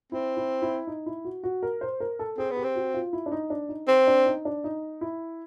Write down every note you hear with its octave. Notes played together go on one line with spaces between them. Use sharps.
C4 E4
E4
E4
D#4
E4
F#4
F#4
A#4
C5
A#4
A4
C4 G#4
B3
G4
C4
F#4
F4
E4
D4
D#4
D4
D#4
C4
D4
D#4
D4
D#4
E4